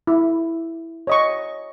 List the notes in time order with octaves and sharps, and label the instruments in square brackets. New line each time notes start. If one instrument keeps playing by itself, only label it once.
[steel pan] E4
C#5 D#5 C#6